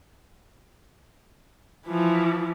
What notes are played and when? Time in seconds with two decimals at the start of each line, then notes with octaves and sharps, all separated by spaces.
1.87 E3 F3